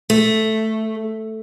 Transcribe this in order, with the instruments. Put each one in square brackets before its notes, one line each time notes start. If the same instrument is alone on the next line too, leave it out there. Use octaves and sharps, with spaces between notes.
[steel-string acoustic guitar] A3